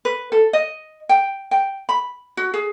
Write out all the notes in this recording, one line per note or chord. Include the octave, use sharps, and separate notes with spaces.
B4
A4
D#5
G5
G5
B5
F#4
G#4